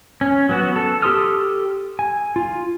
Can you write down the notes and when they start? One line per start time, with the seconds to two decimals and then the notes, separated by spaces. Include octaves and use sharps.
0.21 C#4
0.49 F#3 B3 F#4
0.76 A4
1.02 G4 A4 C6 D#6 F6
1.99 G#5
2.36 F4